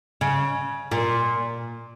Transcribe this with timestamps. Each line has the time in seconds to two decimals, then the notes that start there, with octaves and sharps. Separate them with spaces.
0.21 C#3
0.91 A#2